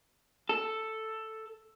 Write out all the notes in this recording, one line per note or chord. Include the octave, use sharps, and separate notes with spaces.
A4